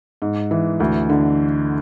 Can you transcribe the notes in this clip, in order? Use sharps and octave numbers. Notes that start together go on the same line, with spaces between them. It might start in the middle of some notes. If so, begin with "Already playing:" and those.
G#2
E3
D2
D3